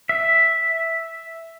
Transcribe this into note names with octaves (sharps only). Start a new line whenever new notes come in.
E5